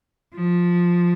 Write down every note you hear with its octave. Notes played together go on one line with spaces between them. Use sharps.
F3